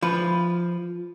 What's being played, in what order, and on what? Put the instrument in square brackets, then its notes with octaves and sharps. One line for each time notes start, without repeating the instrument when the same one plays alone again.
[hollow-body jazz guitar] F3 B4